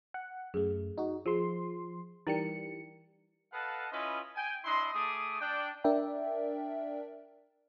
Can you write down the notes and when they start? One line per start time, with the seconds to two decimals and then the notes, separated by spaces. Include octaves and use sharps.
0.14 F#5
0.54 F#2 A3 G#4
0.98 D#4 F#4
1.26 F3 G#4 C6
2.27 E3 G3 D#4 A#4 G5 C#7
3.53 A4 B4 D#5 F5 F#5 A5
3.92 C#4 E4 F4 B4 D#5
4.36 G5 G#5
4.65 D4 E4 D#5 C6
4.94 A3 G#4 D6 D#6
5.41 D4 D5 G5
5.84 D4 A#4 D5 E5 G5